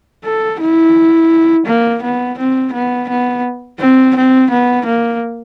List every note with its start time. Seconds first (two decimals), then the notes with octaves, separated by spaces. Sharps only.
0.25 A4
0.60 E4
1.66 A#3
2.03 B3
2.38 C4
2.73 B3
3.09 B3
3.80 C4
4.16 C4
4.51 B3
4.86 A#3